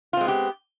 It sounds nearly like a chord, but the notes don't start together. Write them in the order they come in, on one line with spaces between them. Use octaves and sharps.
F4 C4 G#3 B3 G4